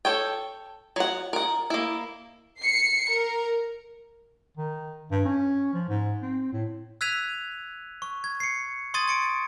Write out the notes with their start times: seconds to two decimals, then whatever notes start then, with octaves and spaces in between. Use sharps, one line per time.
0.05 A4 C#5 G5
0.96 F#3 F#5
1.33 A#4 F#5
1.70 A#3 E4
2.60 C7 C#7
3.11 A#4
4.57 D#3
5.12 G2
5.25 C#4
5.73 F3
5.88 G#2
6.22 C4
6.53 A2
7.01 E6 F#6 G#6 B6 D#7 F7
8.02 C#6
8.24 G#6
8.40 C7 C#7
8.94 C6 C#6 D#6 G#6 A6 D#7
9.08 A6 C#7 D7